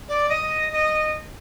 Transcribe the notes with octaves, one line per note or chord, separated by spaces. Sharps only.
D5
D#5
D#5